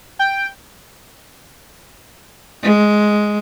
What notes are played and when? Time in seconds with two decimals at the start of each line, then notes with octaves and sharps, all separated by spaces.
0.19 G5
2.63 G#3